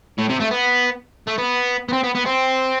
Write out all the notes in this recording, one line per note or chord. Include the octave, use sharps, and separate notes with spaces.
A2
C3
A3
B3
A3
B3
B3
C4
B3
B3
C4